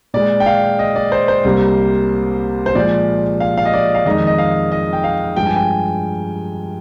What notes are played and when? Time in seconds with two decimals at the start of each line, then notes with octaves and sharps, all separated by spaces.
0.14 A#2 G#3 D5
0.40 G5
0.46 F5
0.79 D#5
0.96 D5
1.12 C5
1.28 C5
1.44 C2 C3 G3 A#3
2.66 C5
2.75 A#2 F3 G#3 D5
3.40 F5
3.57 F5
3.65 D#5
3.73 D5
3.95 F5
4.06 F2 D#3 G#3 D#5
4.27 D#5
4.38 F5
4.72 D#5
4.93 G5
5.04 F5
5.36 G2 F3 G#3 G5
5.46 G#5
5.56 G5